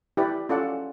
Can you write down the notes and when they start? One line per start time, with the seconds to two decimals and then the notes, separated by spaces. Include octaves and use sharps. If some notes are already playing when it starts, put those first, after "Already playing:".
0.17 E4 G4 B4 D5
0.49 C#4 F4 A4 D5 F#5